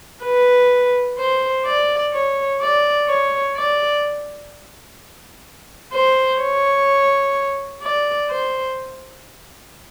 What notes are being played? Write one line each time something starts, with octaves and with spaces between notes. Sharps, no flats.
B4
C5
D5
C#5
D5
C#5
D5
C5
C#5
D5
C5